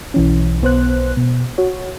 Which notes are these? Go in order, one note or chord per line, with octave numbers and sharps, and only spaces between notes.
B1 E3 C#4
B1 B3 C5 F#6
B2
F#4 C#5